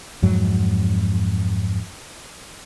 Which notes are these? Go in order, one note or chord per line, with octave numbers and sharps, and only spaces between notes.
F2 G#2 F#3